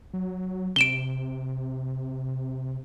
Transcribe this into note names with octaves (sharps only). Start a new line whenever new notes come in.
F#3
C3 D7 E7 G7